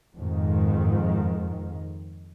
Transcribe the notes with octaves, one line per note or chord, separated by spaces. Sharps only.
F2 G#2 D#3